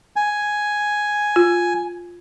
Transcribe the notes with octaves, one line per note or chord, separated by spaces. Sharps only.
G#5
F4